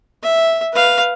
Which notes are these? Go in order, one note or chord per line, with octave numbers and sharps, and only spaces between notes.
E5
B4 F5